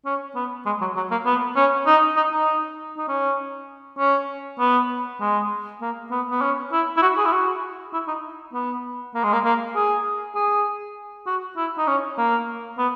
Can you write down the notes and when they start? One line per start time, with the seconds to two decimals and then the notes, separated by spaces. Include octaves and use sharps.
0.05 C#4
0.35 B3
0.66 G#3
0.81 F#3
0.96 F#3
1.11 A#3
1.26 B3
1.56 C#4
1.87 D#4
2.16 D#4
2.32 D#4
2.97 D#4
3.08 C#4
3.98 C#4
4.59 B3
5.21 G#3
5.81 A#3
6.11 B3
6.31 B3
6.41 C#4
6.72 E4
6.97 E4
7.02 F#4
7.18 G#4
7.25 E4
7.32 F#4
7.93 E4
8.07 D#4
8.53 B3
9.14 A#3
9.23 G#3
9.33 A#3
9.44 A#3
9.75 G#4
10.35 G#4
11.26 F#4
11.56 E4
11.78 D#4
11.87 C#4
12.18 A#3
12.78 B3